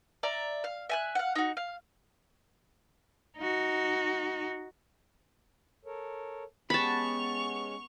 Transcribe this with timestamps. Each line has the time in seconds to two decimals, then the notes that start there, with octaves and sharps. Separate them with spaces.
0.23 D5 E5 A#5
0.64 F5
0.90 E5 G#5 F#6
1.15 F5 F#5
1.35 D#4 F#4
1.57 F5
3.38 D#4 F#4
5.85 A4 A#4 C#5
6.70 G#3 B3 C#4 G4 A5 B5 C#6 F7